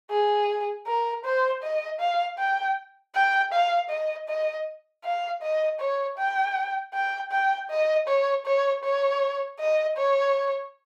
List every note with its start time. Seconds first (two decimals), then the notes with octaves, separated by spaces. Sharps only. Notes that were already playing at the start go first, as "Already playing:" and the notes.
0.10 G#4
0.87 A#4
1.24 C5
1.63 D#5
2.00 F5
2.38 G5
3.15 G5
3.52 F5
3.90 D#5
4.28 D#5
5.04 F5
5.42 D#5
5.80 C#5
6.18 G5
6.94 G5
7.32 G5
7.70 D#5
8.08 C#5
8.46 C#5
8.84 C#5
9.60 D#5
9.97 C#5